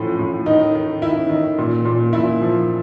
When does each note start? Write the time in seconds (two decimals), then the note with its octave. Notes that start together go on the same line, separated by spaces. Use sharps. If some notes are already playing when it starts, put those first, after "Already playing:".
Already playing: A2 F3
0.19 A2
0.46 D#3 D#4
0.75 D#3
1.02 D#3 E4
1.29 D#3
1.58 A#2
1.85 A#2
2.13 A#2 E4
2.42 F3